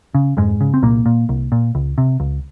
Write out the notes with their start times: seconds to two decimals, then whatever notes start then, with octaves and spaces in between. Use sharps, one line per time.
0.15 C#3
0.37 F2 G#2 G#3
0.61 C#3
0.74 C4
0.82 C2 A#2 A#3
1.06 A#2
1.29 C2
1.52 A#2
1.75 C#2
1.98 C3
2.20 C#2